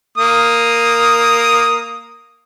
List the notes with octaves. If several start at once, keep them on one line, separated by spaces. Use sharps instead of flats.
A#3 D#6